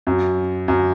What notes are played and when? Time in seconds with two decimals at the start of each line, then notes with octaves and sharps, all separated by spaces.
0.07 F#2
0.68 F#2